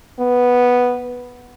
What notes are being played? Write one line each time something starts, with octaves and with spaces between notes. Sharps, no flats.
B3